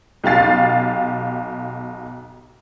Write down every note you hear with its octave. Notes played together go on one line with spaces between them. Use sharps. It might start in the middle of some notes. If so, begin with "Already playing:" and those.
B1 G4 F5 A6 C7